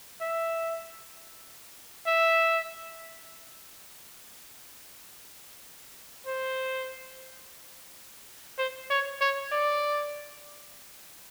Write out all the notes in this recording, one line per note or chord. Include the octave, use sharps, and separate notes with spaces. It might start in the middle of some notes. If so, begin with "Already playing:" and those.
E5
E5
C5
C5
C#5
C#5
D5